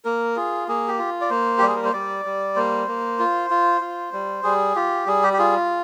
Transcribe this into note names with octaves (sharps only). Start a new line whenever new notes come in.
A#3 A#4
F4 G#4
A#3 G#4
G4
F4
D5
A#3 C5
G3 G4
G#4
A#4
C5
G3 D5
G3
A#3 C5
A#3
F4
F4
F4
G3
G3 G#4
F4 G4
G3 G#4
G4
G4
F4 G#4